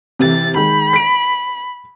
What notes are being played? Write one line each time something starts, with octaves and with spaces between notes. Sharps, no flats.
C3 E3 A6
D#3 G#3 B5
B6 D7